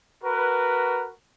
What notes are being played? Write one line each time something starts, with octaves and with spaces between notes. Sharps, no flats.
F#4 A#4 B4